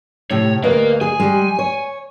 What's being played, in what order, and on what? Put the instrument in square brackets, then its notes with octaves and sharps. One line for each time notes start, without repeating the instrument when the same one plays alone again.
[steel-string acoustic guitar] A2 C3 [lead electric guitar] C#5
[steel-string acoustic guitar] D2 B4 D#5 [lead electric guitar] A#4 F5
[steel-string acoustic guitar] G#4 [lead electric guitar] G#5
[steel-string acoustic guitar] G3 G#3
C#5